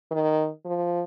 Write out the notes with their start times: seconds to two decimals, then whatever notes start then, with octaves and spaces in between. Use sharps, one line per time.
0.11 D#3
0.65 F3